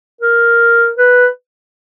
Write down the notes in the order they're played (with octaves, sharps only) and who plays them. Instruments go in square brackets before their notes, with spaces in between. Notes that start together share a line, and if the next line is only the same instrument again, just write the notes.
[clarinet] A#4
B4